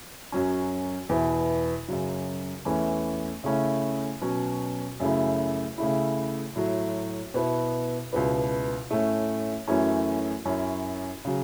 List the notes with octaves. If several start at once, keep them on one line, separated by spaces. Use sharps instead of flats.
F#2 F#3 C#4
E2 B2 B3 E4
F#2 C#3 F#3
E2 E3 A3 C#4 E4
C#3 A3 C#4 E4
B2 F#3 C#4
F#2 C#3 A3 E4
C#3 A3 E4
A2 F#3 A3
B2 B3 E4
C#2 B2 B3 E4
A2 A3 C#4
F#2 E3 A3 C#4 E4
F#2 F#3 C#4 E4
C#3 F#3